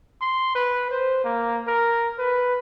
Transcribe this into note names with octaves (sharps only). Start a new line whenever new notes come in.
C6
B4
C5
A#3
A#4
B4